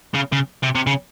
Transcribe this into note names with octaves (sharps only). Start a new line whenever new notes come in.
C#3
C#3
C3
C3
C#3